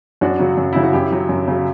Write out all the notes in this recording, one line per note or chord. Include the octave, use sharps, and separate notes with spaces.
F#2 D4 F#4
C#3 F#3
F#2
C#3 F#3 E4
F#4
F#2 E4 G4
C#3 F#3
F#2
C#3 F#3